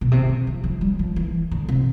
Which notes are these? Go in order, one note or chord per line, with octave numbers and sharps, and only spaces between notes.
B2
C3
E3
F3
F3
G3
F3
E3
D3
C3